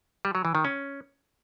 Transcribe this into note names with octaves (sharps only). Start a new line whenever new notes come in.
G3
F#3
E3
D#3
C#4